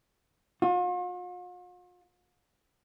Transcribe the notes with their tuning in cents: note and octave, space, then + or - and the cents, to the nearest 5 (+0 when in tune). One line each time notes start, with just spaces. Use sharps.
F4 +45